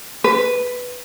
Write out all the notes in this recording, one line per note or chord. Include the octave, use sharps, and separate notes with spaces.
B4